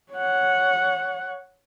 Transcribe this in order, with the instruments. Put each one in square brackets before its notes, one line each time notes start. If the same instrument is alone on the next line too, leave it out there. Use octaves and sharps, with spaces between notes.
[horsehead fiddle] C#5 F#5